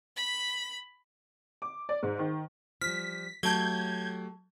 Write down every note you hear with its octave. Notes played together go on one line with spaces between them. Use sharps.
B5 B6
D6
D5
G#2
D#3
F3 G3 F6 B6
F#3 A3 G4 A5 G6 G#6 G7